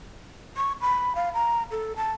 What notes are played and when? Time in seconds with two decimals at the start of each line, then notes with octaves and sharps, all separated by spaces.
0.57 C#6
0.81 B5
1.15 F5
1.34 A#5
1.71 A4
1.96 A5